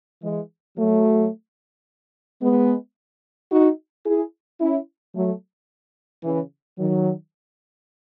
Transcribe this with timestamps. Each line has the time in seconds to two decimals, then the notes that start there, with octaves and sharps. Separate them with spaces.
0.23 E3 G#3
0.78 F#3 A3
2.42 G#3 B3
3.51 D#4 F#4
4.05 E4 G#4
4.60 C#4 E4
5.15 F#3 A3
6.24 C#3 E3
6.79 D#3 F#3